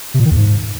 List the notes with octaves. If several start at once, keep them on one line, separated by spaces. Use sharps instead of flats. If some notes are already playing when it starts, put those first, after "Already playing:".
C3
A#2
D#3
E2
G#2